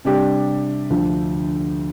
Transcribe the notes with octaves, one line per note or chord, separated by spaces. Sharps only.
C3 G3 D4 G4
D2 D3 F3